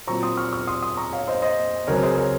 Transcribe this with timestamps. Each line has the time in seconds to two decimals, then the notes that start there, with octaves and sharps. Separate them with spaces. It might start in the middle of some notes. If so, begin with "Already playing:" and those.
0.07 A#2 F#3 C4 A#5 C#6
0.23 C6 D#6
0.37 C#6 F6
0.53 C#6 F6
0.67 C6 D#6
0.82 C6 D#6
0.97 A#5 C#6
1.12 C#5 F5
1.27 C5 D#5
1.42 C5 D#5
1.87 C#2 C#3 F#3 C4 A#4 C#5
2.03 G#4 C5
2.17 A#4 C#5